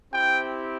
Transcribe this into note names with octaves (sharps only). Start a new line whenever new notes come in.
C4 E4 G4 G5